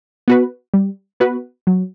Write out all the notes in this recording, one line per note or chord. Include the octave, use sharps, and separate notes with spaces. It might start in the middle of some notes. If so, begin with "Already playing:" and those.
B3 F#4 B4
G3
B3 F#4 B4
F#3